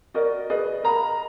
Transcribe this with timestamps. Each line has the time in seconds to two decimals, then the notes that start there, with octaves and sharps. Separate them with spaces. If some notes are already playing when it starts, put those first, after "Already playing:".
0.14 F#4 A#4 D5 D#5
0.50 G#4 B4 D5 D#5
0.84 A#4 F5 A#5 B5